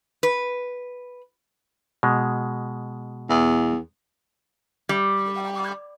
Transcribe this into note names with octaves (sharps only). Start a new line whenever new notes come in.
B4
B2 G#3
E2
G3